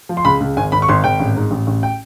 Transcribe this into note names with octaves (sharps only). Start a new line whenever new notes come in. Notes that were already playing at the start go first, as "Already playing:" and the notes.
F3
C6
C#2 B5
C#2
G#1 G#5
G#1 B5
C#6
G#1 C6
G#1 G5
A1
G#2
A1
A1
G5